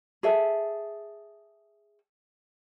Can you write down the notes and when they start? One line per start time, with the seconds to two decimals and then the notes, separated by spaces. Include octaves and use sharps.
0.23 G#4 A4 E5